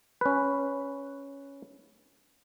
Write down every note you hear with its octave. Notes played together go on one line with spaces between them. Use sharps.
C#4 B4